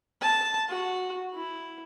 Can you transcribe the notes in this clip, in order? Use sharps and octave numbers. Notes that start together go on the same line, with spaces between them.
A5
F#4
E4